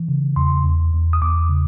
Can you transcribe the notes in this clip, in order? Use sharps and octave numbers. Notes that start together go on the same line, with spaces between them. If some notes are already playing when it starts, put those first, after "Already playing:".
Already playing: E3
C#3
E2 C6
E2
E2
D#6
E2 D6
C#3